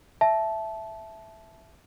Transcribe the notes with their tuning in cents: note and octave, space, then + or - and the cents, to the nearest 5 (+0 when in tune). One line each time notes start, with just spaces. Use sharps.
E5 +5 A5 -15